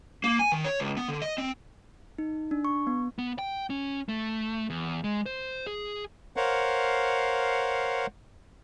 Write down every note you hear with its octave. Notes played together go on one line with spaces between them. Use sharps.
A#3
G#5
D#3
C#5
C#2
B3
D3
D#5
C4
D#4
D4
C#6
B3
B3
G5
C#4
A3
E2
G#3
C5
G#4
A#4 C5 C#5 F5 F#5